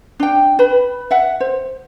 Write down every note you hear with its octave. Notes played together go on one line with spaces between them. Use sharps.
D4 G5
B4 B5
E5 F#5
C5